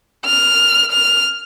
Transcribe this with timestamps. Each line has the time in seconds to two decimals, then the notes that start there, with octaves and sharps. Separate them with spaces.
0.26 F6
0.92 F6